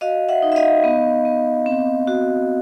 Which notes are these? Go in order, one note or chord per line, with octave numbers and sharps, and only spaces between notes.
F#4 D#5 F5
E5 F#5
D#4
E5
D#5 F5
B3
B3
C4
F#4